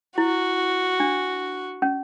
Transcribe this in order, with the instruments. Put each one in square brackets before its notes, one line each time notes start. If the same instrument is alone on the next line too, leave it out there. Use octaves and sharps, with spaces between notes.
[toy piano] E4 [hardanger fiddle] F#4
[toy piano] D4
C#4